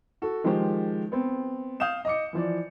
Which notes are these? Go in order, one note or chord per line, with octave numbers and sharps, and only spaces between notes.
F#4 A4
D#3 F3 G#3 G4 C5
B3 C4
F5 D#6 G6 E7
D#5 D6 C#7
E3 F3 D5